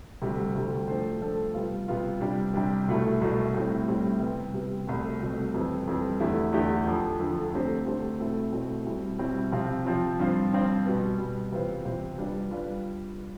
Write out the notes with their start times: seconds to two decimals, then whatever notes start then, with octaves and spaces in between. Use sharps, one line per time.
0.22 D2 C3 G3
0.55 D2 C3 G3
0.88 F3 A3 D4 A4 C5
1.21 F3 A3 D4 A4 C5
1.54 C3 G3 B3 F4
1.88 C3 G3 B3 F4
2.21 C3 G3 D4 G4
2.54 C3 G3 D4 G4
2.88 C2 B2 A3 E4
3.21 C2 B2 A3 E4
3.54 A2 G3 C4 E4
3.87 A2 G3 C4 E4
4.20 C3 G3 B3
4.53 C3 G3 B3
4.87 C2 B2 A3 C4
5.20 C2 B2 A3 C4
5.54 F2 E3 G3 C4
5.87 F2 E3 G3 C4
6.20 E2 D3 A3 E4 G4
6.53 E2 D3 A3 E4 G4
6.87 F2 D3 F3
7.20 F2 D3 F3
7.53 D3 A3 C4 G4 C5
7.86 D3 A3 C4 G4 C5
8.20 B2 A3 C4 E4
8.53 B2 A3 C4 E4
8.85 B2 G3 C4 E4
9.19 B2 G3 C4 E4
9.52 C3 F3 C4 F4
9.85 C3 F3 C4 F4
10.19 G2 F3 C4 F4 C5
10.52 G2 F3 C4 F4 C5
10.86 B2 G3 B3
11.18 B2 G3 B3
11.52 C3 E3 B3 F4 C5
11.85 C3 E3 B3 F4 C5
12.18 G3 D4 F4 B4 D5
12.51 G3 D4 F4 B4 D5